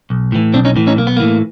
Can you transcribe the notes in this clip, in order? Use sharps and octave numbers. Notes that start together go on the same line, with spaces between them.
B1
A2 E3
B1 C4 D4
C#4 D#4
A2 E3
C#4 D#4
B1 A#3
B3
A2 E3 A#3